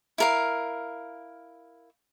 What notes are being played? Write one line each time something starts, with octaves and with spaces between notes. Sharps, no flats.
E4 A#4 F5